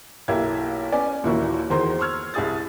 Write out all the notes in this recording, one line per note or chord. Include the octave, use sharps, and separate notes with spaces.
B1 A#3 E4 G4 F5 G#6
B3 C#4 D5 G#5
D#2 A#2 E3 A#3 E4 F#4
E2 D#3 A#3 C5 A#5 C6
C6 C#6 E6 F6 G#6
C2 E4 G#4 D#6 A6